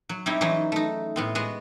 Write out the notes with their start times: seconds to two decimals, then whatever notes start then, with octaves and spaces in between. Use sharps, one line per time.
0.09 F#3
0.26 G3 C4 D#4 E4 C#5
0.41 E3 F#3 G#3 C#4 D#4
0.72 A3 D#4
1.16 A2 B3 C4
1.35 G#3 B3 F#4